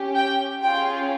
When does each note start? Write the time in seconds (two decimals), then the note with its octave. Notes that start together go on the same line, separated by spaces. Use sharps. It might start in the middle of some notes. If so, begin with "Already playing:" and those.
Already playing: C#4 G4
0.15 G5
0.62 C#4 F4 G#4 G5